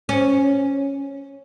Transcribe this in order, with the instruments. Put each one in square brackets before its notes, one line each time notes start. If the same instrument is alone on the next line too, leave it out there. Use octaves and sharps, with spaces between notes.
[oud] C#4